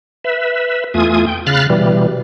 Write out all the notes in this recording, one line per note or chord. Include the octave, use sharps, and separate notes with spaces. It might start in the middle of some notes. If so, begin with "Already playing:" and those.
B4 E5
E2 A3 F4 G#5 D#6
G5
C#3 F5 B5 F6 F#6 A6
B2 E3 G3